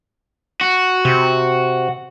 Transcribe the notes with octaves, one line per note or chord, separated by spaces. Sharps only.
F#4
C3